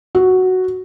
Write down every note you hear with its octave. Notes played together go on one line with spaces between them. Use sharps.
F#4